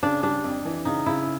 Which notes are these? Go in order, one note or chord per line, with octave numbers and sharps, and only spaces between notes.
C#3 D4
G3 D4
F2
E3
C#3 D#4
C#3 E4